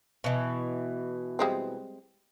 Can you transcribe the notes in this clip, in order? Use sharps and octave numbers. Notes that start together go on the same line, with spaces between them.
B2 E3
G3 G#3 C4